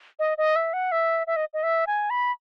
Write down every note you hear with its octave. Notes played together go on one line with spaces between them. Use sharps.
D#5
D#5
E5
F#5
E5
E5
D#5
D#5
E5
G#5
B5